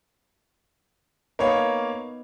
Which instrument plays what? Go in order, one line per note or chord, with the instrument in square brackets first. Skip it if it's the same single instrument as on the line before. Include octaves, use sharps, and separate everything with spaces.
[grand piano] A#3 C#5 F5 [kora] B3 D#4